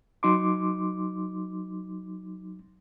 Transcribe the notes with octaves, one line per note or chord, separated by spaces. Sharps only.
F#3 D#4 C6 D6